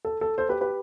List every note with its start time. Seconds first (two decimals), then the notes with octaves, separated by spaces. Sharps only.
0.05 A4
0.21 A4
0.38 A4 C5
0.49 G4 B4
0.61 G4 B4